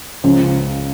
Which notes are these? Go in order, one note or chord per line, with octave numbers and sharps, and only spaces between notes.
C#2 C#3 F3